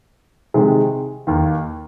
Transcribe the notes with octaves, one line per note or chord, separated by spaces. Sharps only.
C3 D#3 G#3
D#2 D#3 A#3